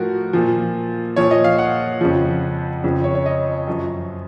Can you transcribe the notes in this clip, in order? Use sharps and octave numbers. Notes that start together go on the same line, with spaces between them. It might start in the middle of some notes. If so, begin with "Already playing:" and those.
Already playing: A2 F3 F#4 A#4
A#2 F3
A#2 F3 C#5
D#5
F5
F#5
F2 C#3 F3
F2 C#3 F3
C#5
C#5
D#5
F#2 F3